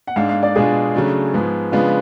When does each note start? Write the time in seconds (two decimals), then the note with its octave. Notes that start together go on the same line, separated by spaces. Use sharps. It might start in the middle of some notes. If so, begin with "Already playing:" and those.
0.07 F#5
0.16 G#2 G#3 D4 F5
0.29 F5
0.43 D5
0.56 B2 G#3 D4 F4 G#4
0.95 C#3 F#3 A3 D4
1.34 G#2 F3 G#3 B3
1.72 C#3 F3 G#3 B3 D4 F4